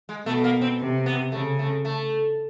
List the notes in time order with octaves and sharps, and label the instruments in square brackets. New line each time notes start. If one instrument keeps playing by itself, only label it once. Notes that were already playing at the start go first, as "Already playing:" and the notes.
[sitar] G#3
[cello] B2 [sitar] A3
[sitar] A#3
C4
[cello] C3
[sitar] B3
[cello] C#3 [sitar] A3
[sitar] A3
A3